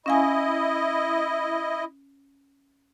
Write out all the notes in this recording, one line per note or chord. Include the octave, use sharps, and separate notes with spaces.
C#4 E4 D#5 F5 G#5